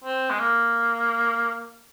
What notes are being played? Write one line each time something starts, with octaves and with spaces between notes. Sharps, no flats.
C4
G#3
A#3